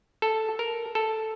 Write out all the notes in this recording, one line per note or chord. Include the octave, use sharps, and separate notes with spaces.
A4
A#4
A4